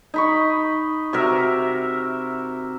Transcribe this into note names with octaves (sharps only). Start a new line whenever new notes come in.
D#4 B5 C#6
C3 F#4 A#4 E5